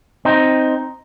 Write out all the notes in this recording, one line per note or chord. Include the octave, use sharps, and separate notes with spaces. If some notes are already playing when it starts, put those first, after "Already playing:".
C4 D#4